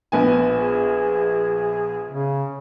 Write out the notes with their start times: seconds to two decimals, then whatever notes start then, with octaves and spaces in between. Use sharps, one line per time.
0.12 A#1 B3 G#5
0.60 G#4
2.09 C#3